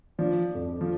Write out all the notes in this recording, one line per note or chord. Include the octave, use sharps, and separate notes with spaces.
F3 D4
F2
F3